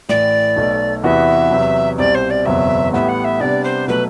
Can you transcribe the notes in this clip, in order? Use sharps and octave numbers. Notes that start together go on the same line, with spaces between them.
A1 A2 E3 D5
B1 B2 A3
E2 C3 E3 B3 F#4 E5
E2 C3 F#3
C2 B2 G3 C4 D5
C5
D5
F#1 E2 B2 F#3 C4 E5
A1 A2 G3 B3 E5
F#5
E5
C3 G3 B3 D4 D5
C5
B2 F#3 A3 B4